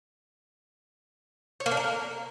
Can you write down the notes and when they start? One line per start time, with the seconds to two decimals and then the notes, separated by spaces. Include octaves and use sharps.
1.60 C#5
1.66 A#3
1.71 D4
1.77 A#4